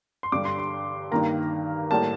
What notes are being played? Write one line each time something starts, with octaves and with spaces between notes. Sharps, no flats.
C6
G2 D3 G3 D6
C6
C6
G2 D#3 A#3 A#5
A2 G3 A#3 A5